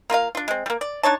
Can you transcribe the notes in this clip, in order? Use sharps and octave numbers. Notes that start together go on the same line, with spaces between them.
A#3 F4 A#4 F5
D4 F4
G#3 C4
G3 A#3
D5
D4 D#4 C#5 A5